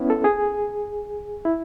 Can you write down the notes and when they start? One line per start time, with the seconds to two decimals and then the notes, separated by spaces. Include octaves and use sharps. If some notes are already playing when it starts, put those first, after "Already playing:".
Already playing: B3 C#4 E4
0.10 A4
0.24 G#4
1.45 E4